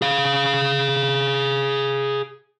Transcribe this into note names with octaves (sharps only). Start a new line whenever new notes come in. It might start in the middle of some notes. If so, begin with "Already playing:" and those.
G#4 F5